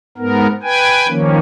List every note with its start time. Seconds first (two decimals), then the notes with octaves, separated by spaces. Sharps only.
0.18 G#2 B3 A#4
0.63 B4 G5 G#5
1.08 D#3 F3 A#3 C#4